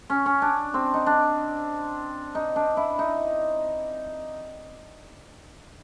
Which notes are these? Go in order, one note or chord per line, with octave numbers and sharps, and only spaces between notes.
C#4
C#4
D4
C4
D#4
D4
D#4
D4
E4
D#4